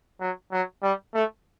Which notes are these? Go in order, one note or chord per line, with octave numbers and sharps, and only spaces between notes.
F#3
F#3
G3
A3